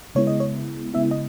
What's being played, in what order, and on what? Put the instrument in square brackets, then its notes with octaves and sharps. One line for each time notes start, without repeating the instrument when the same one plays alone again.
[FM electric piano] C#3 G#3 B3 E4 C#5
D#5
C#5
C#3 G#3 B3 E4 E5
D#5